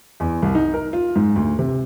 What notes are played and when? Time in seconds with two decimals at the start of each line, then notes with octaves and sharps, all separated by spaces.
0.20 E2
0.42 C2
0.55 D#4
0.74 A#4
0.93 F4
1.16 G#2
1.36 D2
1.59 C3